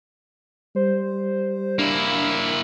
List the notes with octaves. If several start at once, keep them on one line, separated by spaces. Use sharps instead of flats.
G3 C5
A#3 D4 E4